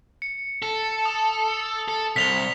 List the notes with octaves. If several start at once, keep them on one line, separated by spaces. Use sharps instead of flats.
C#7
A4
D#6
A4
C2 B6 F7 G7